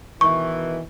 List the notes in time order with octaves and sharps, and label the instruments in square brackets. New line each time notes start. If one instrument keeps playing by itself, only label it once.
[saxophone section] B2 D#3 E3 [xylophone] C#6